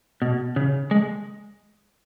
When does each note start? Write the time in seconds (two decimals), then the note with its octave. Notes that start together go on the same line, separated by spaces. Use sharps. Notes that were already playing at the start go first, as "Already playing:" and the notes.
0.22 B2
0.56 C#3
0.91 G#3